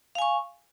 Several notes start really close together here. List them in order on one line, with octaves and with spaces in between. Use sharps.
F5 G#5 C#6